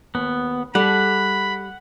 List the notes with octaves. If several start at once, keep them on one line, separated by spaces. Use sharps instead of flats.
D#2 B3
G3 G#4 A4 F#5 B5